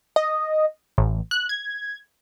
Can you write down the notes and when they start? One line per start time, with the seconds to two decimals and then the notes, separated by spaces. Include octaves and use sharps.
0.16 D#5
0.98 A1
1.31 F#6
1.49 G#6